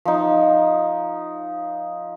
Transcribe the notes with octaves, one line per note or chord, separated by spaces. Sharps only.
F3 D#4